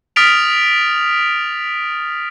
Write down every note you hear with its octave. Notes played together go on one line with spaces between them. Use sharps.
D#6 F6 A6 B6 D7 F7